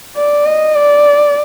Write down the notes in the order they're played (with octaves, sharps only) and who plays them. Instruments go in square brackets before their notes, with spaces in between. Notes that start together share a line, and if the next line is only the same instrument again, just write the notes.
[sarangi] D5
D#5
D5